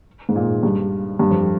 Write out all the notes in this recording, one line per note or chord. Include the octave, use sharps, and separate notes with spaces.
G#2
A#2
G2
G2
F2